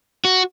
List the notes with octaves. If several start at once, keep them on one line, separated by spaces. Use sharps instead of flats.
F#4